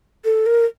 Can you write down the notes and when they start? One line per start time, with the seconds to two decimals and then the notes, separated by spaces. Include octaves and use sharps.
0.25 A4
0.46 A#4